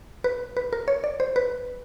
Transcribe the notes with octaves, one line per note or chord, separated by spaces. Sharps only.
B4
B4
A#4
C#5
D5
C5
B4